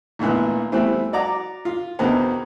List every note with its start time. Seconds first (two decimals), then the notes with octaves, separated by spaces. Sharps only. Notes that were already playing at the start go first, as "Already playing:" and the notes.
0.19 G#1 D2 A#2 E3 B3
0.72 E3 G3 A3 B3 C4 E4
1.13 F#4 D5 A#5 D6
1.65 F4
1.99 E2 B2 D3 D#3 B3 C4